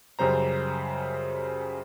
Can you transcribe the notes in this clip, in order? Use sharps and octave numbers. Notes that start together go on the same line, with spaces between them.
F#2 C#3 G3 C5 A#5